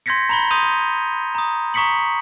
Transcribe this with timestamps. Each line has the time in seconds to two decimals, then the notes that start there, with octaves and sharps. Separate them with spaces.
0.06 C6 G6 G#6 A#6 B6 C#7
0.29 A#5 B5 G7
0.50 C6 D#6 G6 D#7 F7
1.35 A#5 D#6
1.74 A#5 C#6 D#6 B6 C#7 F#7